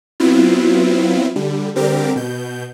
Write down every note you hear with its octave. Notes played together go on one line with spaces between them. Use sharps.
F#3 B3 C4 E4 F4
D3 G3
D3 G3 C4 G4 A#4 D6
B2 G6